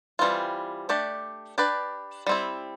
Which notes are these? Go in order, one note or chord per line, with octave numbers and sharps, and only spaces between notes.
E3 G3 C4 F4
A3 D4 G4 D5
D4 G4 B4 D5
G3 C4 E4